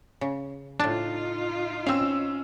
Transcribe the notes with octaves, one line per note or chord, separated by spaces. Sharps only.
C#3
A2 D4 D#4 F4 A5
C4 C#4 F5 E6